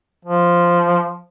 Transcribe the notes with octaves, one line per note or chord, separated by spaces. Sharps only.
F3